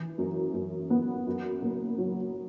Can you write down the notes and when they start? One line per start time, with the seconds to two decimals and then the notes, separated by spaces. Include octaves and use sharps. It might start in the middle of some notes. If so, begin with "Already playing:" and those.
Already playing: E3
0.18 F#2
0.54 F#2
0.90 B3
1.27 F#2
1.62 F#1
1.98 F#3